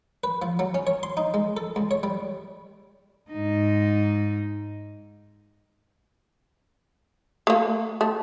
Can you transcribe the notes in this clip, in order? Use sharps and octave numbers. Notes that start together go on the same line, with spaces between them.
B4
F3
F#3
C#4
C#5
C6
D#4
G#3
A4
C#2
C#5
G3
G#2 D#4
A3 A#3
A3